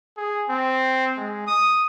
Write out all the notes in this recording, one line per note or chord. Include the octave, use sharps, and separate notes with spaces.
G#4
C4
G#3
D#6